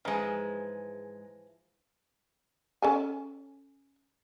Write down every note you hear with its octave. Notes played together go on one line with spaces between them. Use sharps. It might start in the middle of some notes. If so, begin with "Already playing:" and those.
G#2 E3 F3 G#3
C#4 A4 G#5